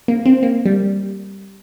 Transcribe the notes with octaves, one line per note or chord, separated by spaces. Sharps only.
A#3
C4
A#3
G3